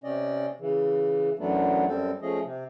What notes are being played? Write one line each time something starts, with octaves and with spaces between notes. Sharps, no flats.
C3 C#4 D5 D#5
C#3 E3
F#2 E3 F#3 A3 B3 D4
F#2 G3 C4 A4
F3 A3 C#4 G#4 D#5
C3